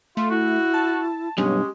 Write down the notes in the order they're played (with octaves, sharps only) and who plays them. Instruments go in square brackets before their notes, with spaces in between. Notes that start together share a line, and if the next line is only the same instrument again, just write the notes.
[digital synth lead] A3 [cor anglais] F4
[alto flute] E4 [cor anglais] F#4
[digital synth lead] A5
[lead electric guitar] B1 G2 [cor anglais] G#3 [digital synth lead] C#4 [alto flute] G4